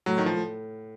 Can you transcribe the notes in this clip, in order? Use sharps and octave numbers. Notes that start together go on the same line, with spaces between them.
A2 F#3
D#3
F3
A2